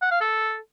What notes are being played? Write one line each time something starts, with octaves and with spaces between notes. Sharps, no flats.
F#5
F5
A4